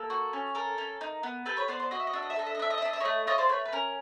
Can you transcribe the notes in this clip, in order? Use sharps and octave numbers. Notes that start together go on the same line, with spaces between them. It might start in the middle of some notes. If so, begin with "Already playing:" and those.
Already playing: A#3 A4
F#4
C#4
A4 A#4
C#4
D#4
B3
G4 A4 B4
B4 C#5
B3 C5 D5
C5 D5
F#4 D#5
E5
D#5
D4 E5
D#5
E5
A4 D#5
E5
D#5
D4 E5
D#5
E5
D4 D#5
E5
A3 C#5 D#5
F4 C#5 D#5
C5 D5
A3 B4 C#5
B4
C#4 A#4